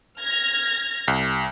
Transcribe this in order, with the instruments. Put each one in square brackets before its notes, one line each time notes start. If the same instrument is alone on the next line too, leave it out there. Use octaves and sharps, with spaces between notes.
[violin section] F6 G#6 A#6
[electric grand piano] C2